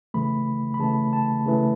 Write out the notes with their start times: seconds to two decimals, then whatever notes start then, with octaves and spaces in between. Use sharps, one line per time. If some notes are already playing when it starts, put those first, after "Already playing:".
0.14 C#3 E3 A3 B5
0.74 B5
0.79 C#3 E3 A3 A5
1.13 A5
1.46 C#3 E3 A3